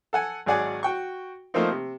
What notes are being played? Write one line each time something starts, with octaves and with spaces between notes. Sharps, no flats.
A4 F#5 G#5
G#1 F#3 G#4 D5 F#5 G#5
F#4 G5 C#6
F3 A3 A#3 C4 D#4
C3